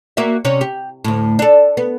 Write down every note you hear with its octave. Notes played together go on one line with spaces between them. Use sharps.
A#3 F#4 E5
C3 C#4 C#5
G4
D2 A2
D4 A4
B3